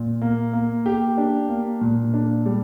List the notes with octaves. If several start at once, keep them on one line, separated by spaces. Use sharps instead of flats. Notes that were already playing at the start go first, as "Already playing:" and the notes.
Already playing: A#2
A#3
A#3
G4
D4
A#3
A#2
D4
G3